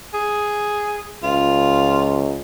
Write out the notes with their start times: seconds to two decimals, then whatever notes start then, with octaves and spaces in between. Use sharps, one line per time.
0.14 G#4
1.23 C#2 F4